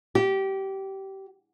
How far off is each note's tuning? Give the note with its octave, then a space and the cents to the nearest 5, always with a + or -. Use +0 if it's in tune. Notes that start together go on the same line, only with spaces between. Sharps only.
G4 -20